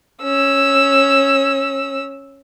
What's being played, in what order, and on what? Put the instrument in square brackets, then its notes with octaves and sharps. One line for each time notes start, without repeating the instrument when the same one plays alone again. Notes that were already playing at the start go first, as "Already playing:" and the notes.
[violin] C#4 E6